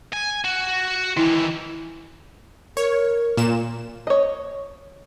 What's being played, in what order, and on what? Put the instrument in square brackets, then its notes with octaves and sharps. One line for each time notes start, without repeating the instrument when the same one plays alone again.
[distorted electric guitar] G#5
F#4
[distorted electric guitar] D#3 E3 [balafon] E4
[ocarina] A#4 [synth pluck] C#5
[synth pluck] A#2 E7
[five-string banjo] C#5 D#5